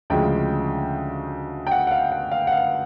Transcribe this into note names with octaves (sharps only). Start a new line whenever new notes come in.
D2 C#3 F3 G#3 G5
G5
F#5
F#5
F5
F#5
F5
F#5
F5